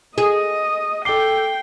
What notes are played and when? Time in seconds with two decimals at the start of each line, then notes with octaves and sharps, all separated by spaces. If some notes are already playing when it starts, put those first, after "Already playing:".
0.18 G#4 D#5
1.05 A4 G5 D6 C7 G7